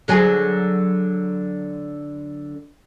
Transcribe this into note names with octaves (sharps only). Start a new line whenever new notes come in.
D3 F#3 G#4